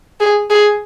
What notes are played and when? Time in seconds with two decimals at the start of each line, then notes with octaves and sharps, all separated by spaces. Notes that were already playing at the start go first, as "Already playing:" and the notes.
0.20 G#4
0.50 G#4